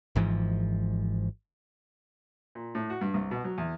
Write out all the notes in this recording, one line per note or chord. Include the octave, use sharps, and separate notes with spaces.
G#1 G#2 E3 F3
A#2
A2
F#4
G2
C2
B2
F#3
E2